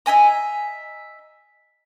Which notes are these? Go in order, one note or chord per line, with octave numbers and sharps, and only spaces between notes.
D#5 E5 G#5 A#5